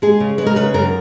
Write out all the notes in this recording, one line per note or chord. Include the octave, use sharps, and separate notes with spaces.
G#3 G#4
C#3
G#3 B4
A#4
C#3 B4
F#2 A#4